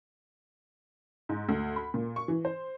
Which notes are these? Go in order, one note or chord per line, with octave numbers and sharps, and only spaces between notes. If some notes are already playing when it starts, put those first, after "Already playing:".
G#2
D2
B5
A#2
C#6
E3
C5